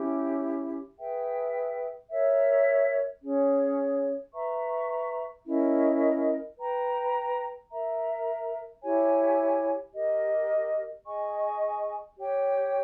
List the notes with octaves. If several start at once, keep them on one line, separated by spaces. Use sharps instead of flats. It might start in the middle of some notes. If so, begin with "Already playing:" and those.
Already playing: C#4 E4 G4
G#4 B4 E5 G5
A#4 C#5 E5
C#4 G#4 C#5
B4 E5 A#5 C#6
C#4 E4 A#4 D#5
B4 G5 A#5
A#4 E5 A#5
E4 G4 C#5 G#5
G4 A#4 D#5
G#4 D#5 G#5 C#6
G4 C#5 G5